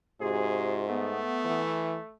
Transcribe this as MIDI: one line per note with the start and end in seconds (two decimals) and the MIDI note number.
0.21 1.23 44
0.21 0.84 48
0.21 0.84 65
0.21 0.84 66
0.21 0.74 68
0.89 2.14 57
0.89 1.69 59
1.45 1.97 52